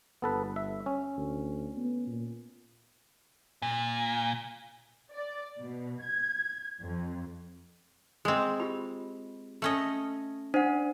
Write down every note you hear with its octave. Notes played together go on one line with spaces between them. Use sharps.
G1 B3 A4 B4
E5
C#4
D2
B3
A#2
A#2
D5
B2
G#6
F2
G#3 C4 G#4 D#5
F4 G4 B5
A3 C#4 D#5
D4 C5 F#5